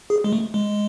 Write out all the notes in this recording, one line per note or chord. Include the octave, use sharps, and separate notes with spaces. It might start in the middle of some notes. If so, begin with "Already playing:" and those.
G#4
G#3
A3
G#3